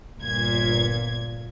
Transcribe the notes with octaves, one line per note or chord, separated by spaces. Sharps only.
G1 A#2 G#6